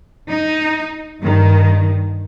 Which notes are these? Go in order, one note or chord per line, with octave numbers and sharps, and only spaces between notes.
D#4
G2 D#3